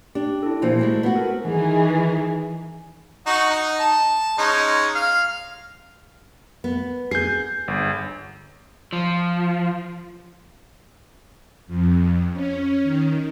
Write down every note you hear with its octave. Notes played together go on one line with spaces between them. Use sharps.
D4 G4
E4 A4
A#2 E3 F3 F4 C5
G#3 A3 F#4
B3 F#4
A4 A#4
D#3 E3 G#4
D#4 F#4
D#4
A5
G#3 C#4 D#4
F5
B3
G#4 G6 C7
G1
F3
F2
C#4
D#3